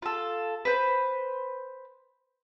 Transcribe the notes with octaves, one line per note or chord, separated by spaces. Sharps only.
F4 A4
B4 C5